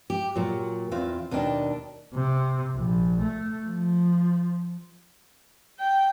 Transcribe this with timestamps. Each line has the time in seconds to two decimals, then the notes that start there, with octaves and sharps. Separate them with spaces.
0.10 G4
0.35 A#2 F#3
0.92 E2 C4 F4 F5
1.31 D#2 B2 D#3 D4 G5
2.14 C3
2.76 A#1
3.22 A3
3.66 F3
5.79 G5